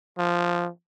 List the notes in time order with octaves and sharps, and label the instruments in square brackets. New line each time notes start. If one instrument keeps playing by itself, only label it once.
[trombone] F3